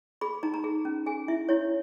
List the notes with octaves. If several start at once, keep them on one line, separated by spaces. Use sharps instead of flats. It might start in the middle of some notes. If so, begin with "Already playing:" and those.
G#4 B5
D#4 A#5
A#5
G#4
C#4
G#4 G#5
E4 E5
E4 C#5